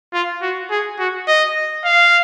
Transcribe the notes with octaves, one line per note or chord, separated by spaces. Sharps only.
F4
F#4
G#4
F#4
D#5
F5